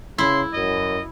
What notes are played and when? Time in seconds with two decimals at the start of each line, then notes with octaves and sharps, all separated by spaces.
0.18 C#3 E4 C6
0.54 F#2 D#5